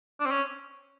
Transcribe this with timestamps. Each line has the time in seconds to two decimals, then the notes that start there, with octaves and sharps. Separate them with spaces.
0.20 D4
0.26 C4
0.31 C#4